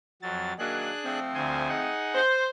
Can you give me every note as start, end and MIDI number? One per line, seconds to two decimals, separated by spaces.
0.22 0.53 41
0.22 0.53 54
0.22 0.53 93
0.59 0.90 51
0.59 0.90 54
0.59 0.90 58
0.59 1.19 62
0.59 1.19 68
0.59 1.19 90
1.04 1.88 53
1.04 1.88 57
1.04 1.88 60
1.34 1.68 38
1.34 1.68 72
1.34 1.68 80
1.68 2.21 63
1.68 2.21 68
1.68 2.21 78
2.15 2.47 72